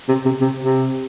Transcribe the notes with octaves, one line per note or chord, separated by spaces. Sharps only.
C3
C3
C3
C3